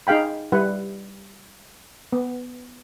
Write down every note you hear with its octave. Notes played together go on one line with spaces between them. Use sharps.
D#4 G#4 F5 G5 B5
G3 E4 B4 F#5
B3